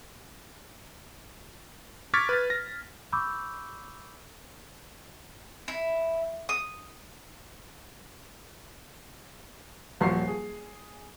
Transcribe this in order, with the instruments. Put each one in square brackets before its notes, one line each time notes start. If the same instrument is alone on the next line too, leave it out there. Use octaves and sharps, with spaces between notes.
[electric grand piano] C#6 D6 F6 G#6 A6 B6
B4 A6
A#6
[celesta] B5 C#6 D6 E6 G6
[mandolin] E4
D#6
[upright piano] D#1 F3 F#3 F#5 C#6 C7
G#4